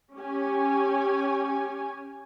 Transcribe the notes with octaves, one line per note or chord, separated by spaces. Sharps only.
C#4 G4 C#5 G#5